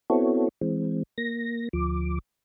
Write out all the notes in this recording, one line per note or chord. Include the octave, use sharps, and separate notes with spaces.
B3 C4 E4 F#4 A4 C#5
E3 G#3 C4
A#3 A#6
D2 F3 D6